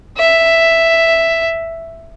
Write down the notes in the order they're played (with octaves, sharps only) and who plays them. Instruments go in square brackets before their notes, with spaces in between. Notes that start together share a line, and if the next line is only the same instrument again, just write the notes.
[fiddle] E5